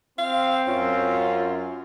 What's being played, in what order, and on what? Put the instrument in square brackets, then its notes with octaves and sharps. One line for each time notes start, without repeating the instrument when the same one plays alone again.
[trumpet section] C4 [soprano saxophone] F5
[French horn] F#2 [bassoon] C#4 [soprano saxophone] F4